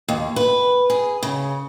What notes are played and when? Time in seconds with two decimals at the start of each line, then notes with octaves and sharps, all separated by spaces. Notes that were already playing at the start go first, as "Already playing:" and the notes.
0.08 D#2
0.36 B4
0.90 G#4
1.23 C#3